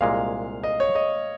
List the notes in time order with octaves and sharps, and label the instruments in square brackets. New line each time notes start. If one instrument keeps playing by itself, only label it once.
[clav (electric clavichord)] C2 A#2 G#3 [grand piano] F5
[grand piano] D#5
C#5
D#5